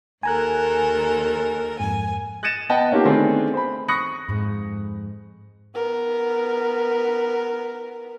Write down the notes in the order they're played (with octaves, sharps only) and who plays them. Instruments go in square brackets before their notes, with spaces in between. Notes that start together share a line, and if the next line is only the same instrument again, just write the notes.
[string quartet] D#2 A4 A#4 [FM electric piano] G#5 A#5 F#6
[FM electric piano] F2 G#2 [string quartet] G#5
[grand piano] F#6 A6 A#6 C#7 D#7 E7
B3 D#5 F#5 G5 A5
A#3 C#4 D#4 F4 G4
D3 D#3 A3 B3 C4 G#4
C5 B5
B5 C#6 D#6 F#6 A#6 C#7
[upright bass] F2 G#2
[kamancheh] B3 A#4